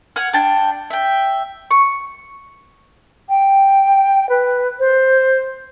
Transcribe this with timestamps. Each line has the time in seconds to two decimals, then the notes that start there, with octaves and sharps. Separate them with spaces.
0.16 F#5 G#5 F6
0.33 D4 G5 A5
0.90 E5 G5
1.71 C#6
3.29 G5
4.29 B4
4.80 C5